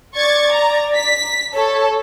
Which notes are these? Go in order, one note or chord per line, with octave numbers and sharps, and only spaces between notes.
D5 C#6 G#6 A6
A#5
B6
A4 C#5